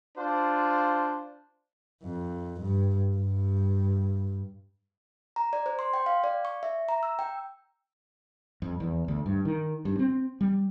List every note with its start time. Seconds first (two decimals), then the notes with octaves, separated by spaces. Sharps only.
0.17 D4 F4 C5
2.03 F2
2.62 G2
3.16 G2
5.36 A#5
5.53 D5
5.66 C5
5.79 C6
5.94 G5
6.06 F5
6.24 D5
6.45 C#6
6.63 E5
6.89 A#5
7.03 E6
7.19 G5
8.62 F2
8.80 E2
9.08 D2
9.26 G2
9.45 D#3
9.85 G2
9.99 C4
10.41 G3